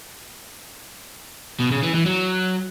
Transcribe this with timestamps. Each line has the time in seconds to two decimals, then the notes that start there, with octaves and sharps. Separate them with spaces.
1.60 B2
1.71 C#3
1.83 E3
1.94 E3
2.06 F#3